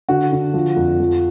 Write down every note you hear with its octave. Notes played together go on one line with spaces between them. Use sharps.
D3 F#4
D3
F3
F2
F3